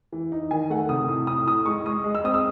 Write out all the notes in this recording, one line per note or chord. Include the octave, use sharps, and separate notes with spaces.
E3
D#4
D#3 G#5
A3 F#5
C3 D#6
A2 D#6
A2 D#6
A2 D#6
G#3 C#6
G#3 D#6
G#3
E6
C4 D#6
E6